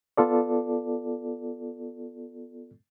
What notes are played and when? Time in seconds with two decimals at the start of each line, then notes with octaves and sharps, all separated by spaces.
0.17 B3 F4 A4 D5